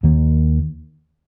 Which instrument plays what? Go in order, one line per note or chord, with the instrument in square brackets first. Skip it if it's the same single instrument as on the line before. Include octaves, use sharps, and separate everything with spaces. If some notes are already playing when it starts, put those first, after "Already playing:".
[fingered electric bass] D#2 D#3 A#3